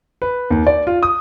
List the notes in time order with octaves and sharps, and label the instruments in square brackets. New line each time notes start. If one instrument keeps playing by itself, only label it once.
[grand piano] B4
D#2
D5
F4
D#6